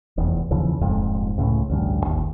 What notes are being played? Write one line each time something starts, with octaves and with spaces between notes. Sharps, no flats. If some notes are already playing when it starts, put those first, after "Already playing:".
F1 E2
D#2 C#3 E3 F3
D#1 F2 G#2
C#2 A2
A1 D2 G2
G1 D#2